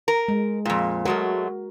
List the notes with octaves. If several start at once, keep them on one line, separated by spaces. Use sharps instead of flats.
A#4
G#3
F2 A#2
F#3 G#3 A3 F#4 A#4